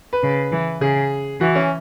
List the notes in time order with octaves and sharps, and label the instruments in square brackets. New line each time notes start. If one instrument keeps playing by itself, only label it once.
[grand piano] B4
[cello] C#3
E3
[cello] C#3 [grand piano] G#4
[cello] E3 [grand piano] F#4
[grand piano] C#4